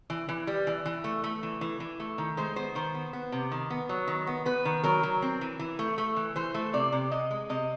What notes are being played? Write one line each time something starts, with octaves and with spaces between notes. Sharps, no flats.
E3
E3
G3
E3
E3
A3
A3
E3
E3
E3
A3
D#3
G#3 C5
B3 C5
D#3 C5
B3
B3
C3
D#3
B3
F#3
D#3
B3
B3 B4
D#3
F#3 A#4
F#3
C4
E3
E3
A3
A3
E3
E3 C5
A3
C3 D5
C3
C3 D#5
G#3
C3 D#5